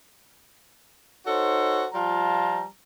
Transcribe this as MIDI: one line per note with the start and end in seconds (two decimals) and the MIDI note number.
1.27 1.86 63
1.27 1.86 66
1.27 1.86 69
1.27 1.86 72
1.27 1.86 73
1.93 2.66 53
1.93 2.66 55
1.93 2.66 65
1.93 2.66 81
1.93 2.66 82